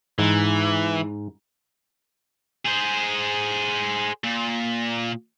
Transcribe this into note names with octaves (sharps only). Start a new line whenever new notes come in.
G#2 E3
G#4 C5
A#2